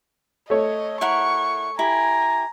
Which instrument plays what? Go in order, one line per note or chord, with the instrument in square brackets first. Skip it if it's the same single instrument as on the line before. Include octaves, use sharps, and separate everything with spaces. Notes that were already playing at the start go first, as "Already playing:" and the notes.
[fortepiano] A3 C#5 [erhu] D#5
[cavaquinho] E4 A#4 F#5 [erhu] C#6
[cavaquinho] E4 G4 [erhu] G#5 [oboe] A#5